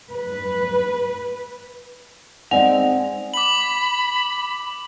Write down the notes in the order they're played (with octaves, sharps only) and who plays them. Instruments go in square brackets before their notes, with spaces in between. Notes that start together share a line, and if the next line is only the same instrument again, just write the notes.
[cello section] B4
[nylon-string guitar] G#3 C4 D#4 [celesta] D5 G#5 F7 [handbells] F#5
[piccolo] B5 [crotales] D6 F#7